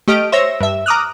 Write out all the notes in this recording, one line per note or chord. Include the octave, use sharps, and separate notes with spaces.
A3 G4 D#5 F6 D7
C5 C#5 E5 E6 A#6
G2 E5
A#5 D6 D#6 F6 F#6